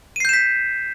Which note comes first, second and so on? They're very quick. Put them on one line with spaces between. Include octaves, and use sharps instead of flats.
D#7 C7 G6 E7 B6